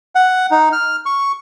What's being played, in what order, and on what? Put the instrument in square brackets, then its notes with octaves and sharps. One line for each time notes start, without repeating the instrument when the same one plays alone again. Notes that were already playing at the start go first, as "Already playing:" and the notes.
[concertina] F#5
D#4
F6
C#6